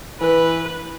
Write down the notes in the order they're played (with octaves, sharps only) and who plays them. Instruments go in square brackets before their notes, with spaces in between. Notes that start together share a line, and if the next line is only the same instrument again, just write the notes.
[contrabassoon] E3 [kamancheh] B4